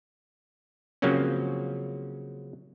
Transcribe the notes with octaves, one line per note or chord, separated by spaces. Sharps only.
C#3 F3 F#3 A#3 C4 C#4